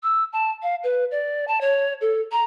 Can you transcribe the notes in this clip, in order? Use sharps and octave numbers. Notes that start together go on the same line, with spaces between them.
E6
A5
F5
B4
D5
A5
C#5
A4
A#5